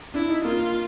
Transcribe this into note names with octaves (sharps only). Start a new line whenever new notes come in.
D4 E4
D#4
A#3 F4